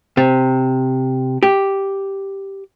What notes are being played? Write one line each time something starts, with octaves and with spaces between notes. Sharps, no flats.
C3
G4